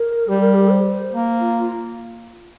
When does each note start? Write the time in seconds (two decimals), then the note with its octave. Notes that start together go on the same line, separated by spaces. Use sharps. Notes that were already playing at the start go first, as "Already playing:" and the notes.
Already playing: A#4
0.28 G3 G4
0.41 A#4
0.54 G4
0.71 C5
1.12 A#3
1.40 F4